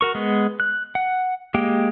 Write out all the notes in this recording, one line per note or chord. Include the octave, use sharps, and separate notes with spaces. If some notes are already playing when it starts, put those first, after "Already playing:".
F#4 A#4 C#6
G#3 B3
F#6
F#5
G#3 A#3 G4 G5